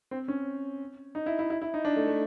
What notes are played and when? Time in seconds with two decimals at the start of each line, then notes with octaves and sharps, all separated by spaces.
0.11 C4
0.28 C#4
1.15 D#4
1.26 E4
1.39 E4
1.50 E4
1.62 E4
1.74 D#4
1.85 D4
1.96 A3
2.07 A3